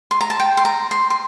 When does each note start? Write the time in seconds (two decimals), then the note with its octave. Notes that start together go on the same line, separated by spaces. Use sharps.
0.11 C6
0.21 A#5
0.30 A5
0.40 G5
0.57 C6
0.65 A#5
0.91 C6
1.10 C6